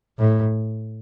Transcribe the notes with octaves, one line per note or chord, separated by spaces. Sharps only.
A2